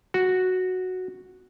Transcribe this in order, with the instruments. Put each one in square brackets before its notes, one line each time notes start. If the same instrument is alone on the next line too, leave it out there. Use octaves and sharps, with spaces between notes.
[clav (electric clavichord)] F#4